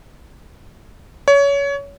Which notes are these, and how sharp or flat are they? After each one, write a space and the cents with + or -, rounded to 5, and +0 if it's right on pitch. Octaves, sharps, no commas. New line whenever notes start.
C#5 +25